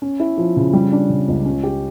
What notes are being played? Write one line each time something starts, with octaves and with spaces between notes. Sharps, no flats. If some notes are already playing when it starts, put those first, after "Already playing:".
C#4
E4
F3
C#3
G3
D4
C#3
C#2
C#4
G4